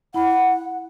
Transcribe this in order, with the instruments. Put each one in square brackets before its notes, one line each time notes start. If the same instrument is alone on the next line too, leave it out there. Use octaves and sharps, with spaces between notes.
[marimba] E4 B5 [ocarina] F#5